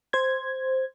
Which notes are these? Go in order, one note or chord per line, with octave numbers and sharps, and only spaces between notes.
C5 G#6